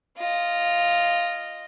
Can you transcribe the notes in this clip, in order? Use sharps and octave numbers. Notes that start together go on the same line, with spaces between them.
F4 D#5